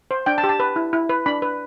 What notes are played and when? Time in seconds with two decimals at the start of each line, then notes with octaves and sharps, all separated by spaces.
0.11 C5
0.26 D4 G5
0.38 A5
0.44 G4
0.49 A5
0.60 B4
0.76 E4
0.93 E4
1.09 B4
1.26 D4 B5
1.42 B4